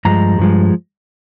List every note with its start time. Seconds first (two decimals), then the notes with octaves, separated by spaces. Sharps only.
0.05 G2 F3 G#3 A#5
0.39 G2 F3 G#3